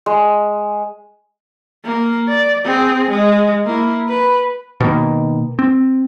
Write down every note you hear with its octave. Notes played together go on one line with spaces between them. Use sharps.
G#3
A#3
D5
C4 G#4
G#3
A#3 E4
B4
B2 D#3 A#3
C4